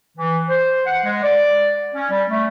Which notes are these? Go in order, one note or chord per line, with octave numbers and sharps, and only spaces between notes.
E3
C5
F#5
G#3
D5
C#4
G3
A3